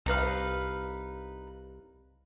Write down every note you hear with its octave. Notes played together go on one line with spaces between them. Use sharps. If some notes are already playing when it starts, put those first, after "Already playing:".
C2 D#4 B4 F5